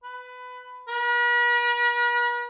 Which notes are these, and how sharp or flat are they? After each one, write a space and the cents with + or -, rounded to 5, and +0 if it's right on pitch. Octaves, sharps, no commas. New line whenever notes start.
B4 +20
B4 -45